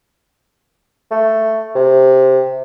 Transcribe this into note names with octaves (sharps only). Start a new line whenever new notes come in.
A3
C3